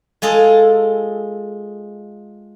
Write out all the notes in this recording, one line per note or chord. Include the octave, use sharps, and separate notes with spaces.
G#3 F4 G#4 A4